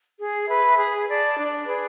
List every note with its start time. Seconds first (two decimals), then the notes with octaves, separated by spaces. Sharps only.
0.19 G#4
0.48 B4 E5
0.78 G#4
1.09 D5 A5
1.38 D4
1.67 G#4 B4 D5